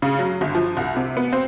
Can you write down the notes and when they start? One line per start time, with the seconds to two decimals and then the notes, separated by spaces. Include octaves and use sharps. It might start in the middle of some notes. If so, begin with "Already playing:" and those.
0.02 C#3
0.19 F#3
0.41 G1
0.55 F3
0.77 C2
0.97 C3
1.17 B3
1.33 C4